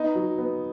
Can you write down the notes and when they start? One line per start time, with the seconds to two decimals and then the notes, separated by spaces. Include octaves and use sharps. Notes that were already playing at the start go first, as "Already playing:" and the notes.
Already playing: B3 D#4
0.15 F#3
0.38 B3